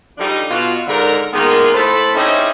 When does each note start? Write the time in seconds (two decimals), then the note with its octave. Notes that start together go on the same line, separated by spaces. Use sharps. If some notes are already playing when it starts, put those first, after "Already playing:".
0.18 D3 F3 G3 D4 D#4
0.49 B2 F4 F#4
0.87 G#2 D3 A#4
1.33 D#3 G#3 A#3 B3 F4
1.73 A2 A3 A4 C5 B5
2.14 C4 C#4 D#4 E4 G4 G#4